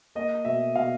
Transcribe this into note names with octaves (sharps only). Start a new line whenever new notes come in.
A#3 D#5
B2 E5
B2 F5